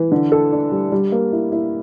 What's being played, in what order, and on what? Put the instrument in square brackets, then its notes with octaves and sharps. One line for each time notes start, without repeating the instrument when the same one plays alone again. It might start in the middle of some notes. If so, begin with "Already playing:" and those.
Already playing: [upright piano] E3
D3
A4
D4
G3
G3
A#3
E4
E4